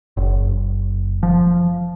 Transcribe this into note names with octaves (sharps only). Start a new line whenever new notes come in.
F#1
F3